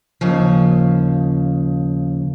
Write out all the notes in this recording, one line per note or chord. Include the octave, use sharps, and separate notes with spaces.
D#2 C#3 F3